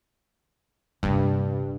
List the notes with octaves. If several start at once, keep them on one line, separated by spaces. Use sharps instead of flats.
D#1 G2 C3